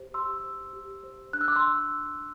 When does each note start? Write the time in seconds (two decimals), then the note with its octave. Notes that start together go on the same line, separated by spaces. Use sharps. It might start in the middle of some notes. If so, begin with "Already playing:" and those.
Already playing: G4 C5
0.14 G4 C6 E6
0.44 C5
0.73 G4
1.04 C5
1.33 D4 F#6
1.41 E6
1.48 D6
1.56 C6 E6